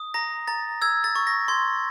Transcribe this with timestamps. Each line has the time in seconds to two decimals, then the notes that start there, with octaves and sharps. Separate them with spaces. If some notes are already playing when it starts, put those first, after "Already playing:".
Already playing: D#6
0.14 A#5 A#6
0.47 A#5 A6
0.82 E6 G#6
1.04 A6
1.15 C#6
1.27 A#6
1.48 C6 G#6